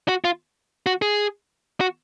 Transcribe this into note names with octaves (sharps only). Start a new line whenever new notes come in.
F#4
F4
F#4
G#4
F#4